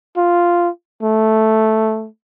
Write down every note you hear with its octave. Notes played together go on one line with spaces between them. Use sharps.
F4
A3